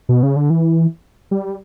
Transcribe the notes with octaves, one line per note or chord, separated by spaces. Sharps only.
B2
C#3
D3
E3
G3